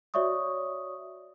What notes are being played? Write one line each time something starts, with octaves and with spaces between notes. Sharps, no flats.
F#4 C#5 D5 E5 C#6 D#6